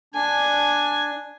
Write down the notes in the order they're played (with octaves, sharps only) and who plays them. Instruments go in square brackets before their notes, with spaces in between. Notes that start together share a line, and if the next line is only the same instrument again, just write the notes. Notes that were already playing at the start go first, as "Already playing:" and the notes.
[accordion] D4 [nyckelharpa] G#5